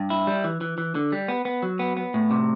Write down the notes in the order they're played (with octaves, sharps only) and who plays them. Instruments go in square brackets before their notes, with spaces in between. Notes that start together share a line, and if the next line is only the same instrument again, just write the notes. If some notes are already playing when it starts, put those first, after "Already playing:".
Already playing: [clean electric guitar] G2
E4
G3
E3
E3
E3
D3
G3
B3
B3
F#3
B3
B3
A2
C3